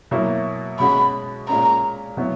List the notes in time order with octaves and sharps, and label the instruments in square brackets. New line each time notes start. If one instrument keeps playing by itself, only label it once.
[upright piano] B2 F#3 A#3 E4
[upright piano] B2 G#3 C#4 F#4 [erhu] B5
[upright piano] A#2 G#3 C#4 [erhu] A#5
[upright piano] B2 F#3 B3 E4